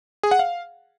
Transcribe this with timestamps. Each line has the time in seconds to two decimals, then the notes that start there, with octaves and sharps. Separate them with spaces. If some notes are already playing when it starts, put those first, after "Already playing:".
0.23 G#4
0.31 F#5
0.39 F5